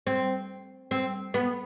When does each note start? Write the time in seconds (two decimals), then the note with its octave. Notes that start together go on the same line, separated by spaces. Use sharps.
0.07 C4
0.91 C4
1.34 B3